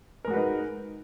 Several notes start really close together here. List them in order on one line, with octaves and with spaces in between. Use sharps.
A#4 G#3 F#4 B4 D#4